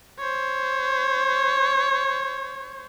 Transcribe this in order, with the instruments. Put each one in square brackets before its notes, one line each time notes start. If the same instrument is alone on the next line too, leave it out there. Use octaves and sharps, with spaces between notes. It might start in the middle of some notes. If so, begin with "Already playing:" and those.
[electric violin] C5 C#5